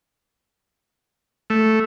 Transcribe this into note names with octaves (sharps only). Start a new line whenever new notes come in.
A3